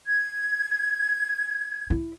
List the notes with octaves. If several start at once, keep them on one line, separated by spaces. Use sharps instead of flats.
G#6
E4